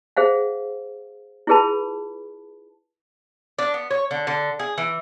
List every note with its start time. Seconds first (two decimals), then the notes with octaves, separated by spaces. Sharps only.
0.17 G#4 C5 F5 F#5
1.47 E4 F4 G#4 B4 A5 B5
3.59 D4
3.74 B3
3.91 C#5
4.11 D3
4.27 D3
4.59 G#4
4.78 E3